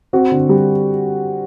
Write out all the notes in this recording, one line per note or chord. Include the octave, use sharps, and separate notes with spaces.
C4 F#4
D3
G3